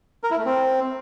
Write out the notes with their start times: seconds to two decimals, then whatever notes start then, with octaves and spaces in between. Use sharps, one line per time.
0.23 A#4
0.31 E4
0.38 A3
0.45 C4